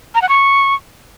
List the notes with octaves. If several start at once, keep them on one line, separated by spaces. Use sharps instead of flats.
A#5
F#5
C#6